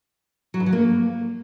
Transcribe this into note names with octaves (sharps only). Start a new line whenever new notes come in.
F#3
G2
F#3
A#3